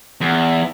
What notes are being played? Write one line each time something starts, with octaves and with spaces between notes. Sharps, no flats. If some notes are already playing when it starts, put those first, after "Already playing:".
E2